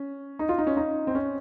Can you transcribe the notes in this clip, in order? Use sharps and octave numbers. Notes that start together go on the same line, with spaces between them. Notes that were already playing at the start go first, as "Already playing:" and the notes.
Already playing: C#4
D#4
F4
D#4
C#4
D#4
C4
C#4